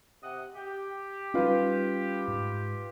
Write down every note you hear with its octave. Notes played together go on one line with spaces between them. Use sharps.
C3 D#5 F#5
G4
G3 C#4 D#4 F4 B4
G#2